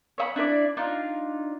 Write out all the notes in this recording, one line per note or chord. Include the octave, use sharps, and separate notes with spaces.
C#5 E5 B5
D4 E4 B4 D5
D4 D#4 F4